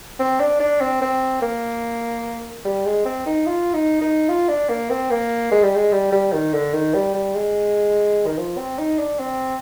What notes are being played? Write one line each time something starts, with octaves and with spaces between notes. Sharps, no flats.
C4
D4
D4
C4
C4
A#3
G3
G#3
C4
D#4
F4
D#4
D#4
F4
D4
A#3
C4
A#3
G#3
G3
G#3
G3
G3
D#3
D3
D#3
G3
G3
G#3
D#3
F3
C4
D#4
D4
C4